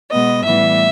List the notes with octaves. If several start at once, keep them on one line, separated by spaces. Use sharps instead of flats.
B2 G#3 B3 D#5
A2 E3 G3 B3 E5